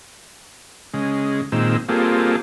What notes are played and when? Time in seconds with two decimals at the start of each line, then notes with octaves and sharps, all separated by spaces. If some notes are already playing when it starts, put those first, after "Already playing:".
0.94 C#3 G#3
1.52 A#2 D#3 G#3 C4 E6
1.89 G3 A#3 C4 F4 G#4 A4